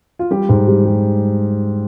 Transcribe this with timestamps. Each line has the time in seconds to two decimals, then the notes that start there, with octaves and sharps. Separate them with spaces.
0.19 F4
0.31 G3 G4
0.49 G#2
0.68 G3
0.85 G3